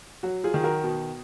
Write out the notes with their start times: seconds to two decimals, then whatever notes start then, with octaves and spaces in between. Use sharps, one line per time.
0.23 F#3 F#4
0.44 F4 G#4
0.54 D#3
0.63 F#4 A#4
0.84 B2